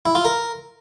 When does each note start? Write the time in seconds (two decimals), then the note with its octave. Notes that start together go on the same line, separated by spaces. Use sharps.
0.06 E4
0.15 F4
0.25 A#4